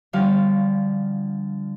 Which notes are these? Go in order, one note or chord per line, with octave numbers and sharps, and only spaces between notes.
D3 F3 G3 F5